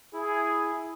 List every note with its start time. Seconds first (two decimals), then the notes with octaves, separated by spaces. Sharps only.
0.13 E4 G#4